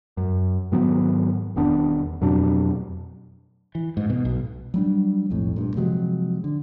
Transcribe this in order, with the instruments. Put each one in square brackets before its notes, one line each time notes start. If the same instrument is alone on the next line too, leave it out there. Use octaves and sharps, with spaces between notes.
[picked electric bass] F#2
G#2 D#3 F#3 B3
E1 D#3 B3 D4
F2 B2 F#3 D4
[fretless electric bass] E3
G#2
B2
B1
[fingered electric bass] F#3 G3 D4
B1 F2 A2
G2 A#2
C3 F3 F#3 G#3
D3